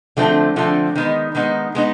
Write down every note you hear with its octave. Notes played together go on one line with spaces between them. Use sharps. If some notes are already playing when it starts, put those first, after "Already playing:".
D3 F3 A3 C4
D3 F3 A3 C4
D#3 G#3 B3 D#4
D#3 G#3 B3 D#4
G#3 B3 D#4